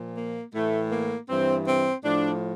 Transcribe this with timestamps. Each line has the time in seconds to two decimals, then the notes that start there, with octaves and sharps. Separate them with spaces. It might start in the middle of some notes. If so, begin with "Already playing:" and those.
Already playing: A#2 F3
0.16 A#3
0.54 A2 E3 A3
0.91 A#3
1.29 G2 E3 C4
1.66 C4
2.04 A2 F3 D4